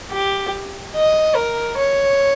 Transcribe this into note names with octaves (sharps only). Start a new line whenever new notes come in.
G4
D#5
A#4
C#5